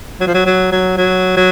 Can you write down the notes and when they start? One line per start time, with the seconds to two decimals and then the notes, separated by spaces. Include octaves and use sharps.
0.20 F#3
0.27 F3
0.34 F#3
0.46 F#3
0.72 F#3
0.97 F#3
1.37 F#3